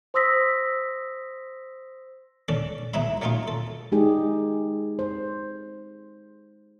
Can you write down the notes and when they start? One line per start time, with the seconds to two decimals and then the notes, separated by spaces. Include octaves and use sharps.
0.14 C5 C6 D#6 E6 A#6 B6
2.48 C#4 D4 A4
2.94 B1 D#4 E4 E5 B5
3.22 F#3 A3 C#4 D#4 F4
3.48 A4
3.92 G#3 D#4 G4 G#4
4.99 C5